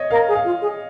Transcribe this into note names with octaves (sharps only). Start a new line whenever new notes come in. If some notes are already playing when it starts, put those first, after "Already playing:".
Already playing: C#5 D#5
A#4 F5
G#4
F5
F4
G#4